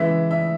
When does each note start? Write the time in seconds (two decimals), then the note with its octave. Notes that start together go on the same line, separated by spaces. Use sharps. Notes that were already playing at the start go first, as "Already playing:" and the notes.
Already playing: C#3 E3 G#3 E5
0.31 E5